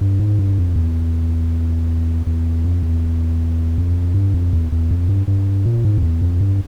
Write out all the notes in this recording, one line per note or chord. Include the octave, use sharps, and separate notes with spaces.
G2
G#2
G2
F2
E2
E2
F2
E2
F2
G2
F2
E2
E2
F2
G2
G2
A#2
G#2
F2
E2
F2
G2